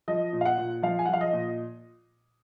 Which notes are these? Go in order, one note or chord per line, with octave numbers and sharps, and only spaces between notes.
F3 D#5
A#2
F5
F#5
A#2
F3 F5
G#5
F#5
F3 F5
D#5
A#2